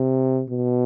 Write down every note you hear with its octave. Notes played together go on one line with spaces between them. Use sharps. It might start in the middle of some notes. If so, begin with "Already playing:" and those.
Already playing: C3
B2